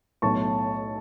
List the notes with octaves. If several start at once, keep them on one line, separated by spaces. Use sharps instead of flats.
B1 A2 A3 A5 C#6